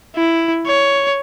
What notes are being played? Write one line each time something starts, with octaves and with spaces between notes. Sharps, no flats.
E4
C#5